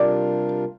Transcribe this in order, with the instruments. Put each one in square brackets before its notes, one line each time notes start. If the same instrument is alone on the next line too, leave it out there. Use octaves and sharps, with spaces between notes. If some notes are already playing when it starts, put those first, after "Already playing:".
Already playing: [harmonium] C3 G3 D4 F4 A#4 [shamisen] D5